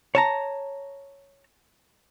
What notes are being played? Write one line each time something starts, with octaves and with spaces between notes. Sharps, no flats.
C#5 A5 A#5